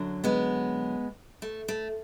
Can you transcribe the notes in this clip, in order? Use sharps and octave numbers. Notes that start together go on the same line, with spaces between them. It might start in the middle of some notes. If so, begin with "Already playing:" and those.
Already playing: F#2 D3 F#3
G#3 B3
A3
A3